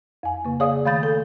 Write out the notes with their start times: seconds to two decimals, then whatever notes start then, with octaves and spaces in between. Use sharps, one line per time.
0.23 F2 G#5
0.45 C#3 A#3
0.60 G#4 C#5 D5 F5 D#6
0.85 D#3 A3 F5 B5 G6 A6
1.03 A4